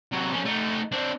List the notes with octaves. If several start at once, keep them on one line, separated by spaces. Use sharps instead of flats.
C3 F#3
F3 C#4
A3 D#4
C4 D4